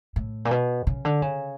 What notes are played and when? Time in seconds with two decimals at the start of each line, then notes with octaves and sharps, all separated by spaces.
0.16 A2
0.45 A#2
0.51 B2
0.87 C#3
1.05 D3
1.22 C#3